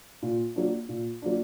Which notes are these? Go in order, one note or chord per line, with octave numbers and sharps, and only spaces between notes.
A#2
F#3 A#3 D4
A#2
F#3 A#3 D4